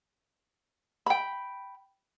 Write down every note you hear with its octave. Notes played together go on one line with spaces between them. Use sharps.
G5 B5